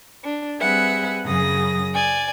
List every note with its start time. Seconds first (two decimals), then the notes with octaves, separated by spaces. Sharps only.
0.23 D4
0.60 G3 C4 G#4 B4 E5 F#5
1.24 F#2 C#3 F#3 G#4 D#6 A#6
1.94 D5 G#5